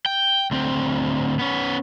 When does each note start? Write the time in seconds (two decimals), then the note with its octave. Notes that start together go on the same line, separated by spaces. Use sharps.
0.06 G5
0.51 D2 C4
1.39 B3 C#4